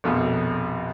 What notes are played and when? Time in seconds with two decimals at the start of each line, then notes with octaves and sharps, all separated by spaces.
0.04 A#1 F2 B2